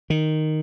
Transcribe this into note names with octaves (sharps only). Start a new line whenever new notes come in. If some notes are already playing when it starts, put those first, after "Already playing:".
D#3